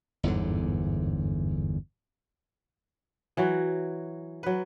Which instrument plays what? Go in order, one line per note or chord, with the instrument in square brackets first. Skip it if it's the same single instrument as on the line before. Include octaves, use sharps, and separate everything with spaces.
[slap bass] G1 E2 G#2 D3
[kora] E3 F#3 F#4
F#3 B4